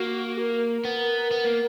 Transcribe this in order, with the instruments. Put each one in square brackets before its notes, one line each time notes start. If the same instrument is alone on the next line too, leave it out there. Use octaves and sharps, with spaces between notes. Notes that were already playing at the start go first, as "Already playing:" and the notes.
Already playing: [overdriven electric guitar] A#3 [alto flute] F#4
[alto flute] A#4
[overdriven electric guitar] B3
B3
A#3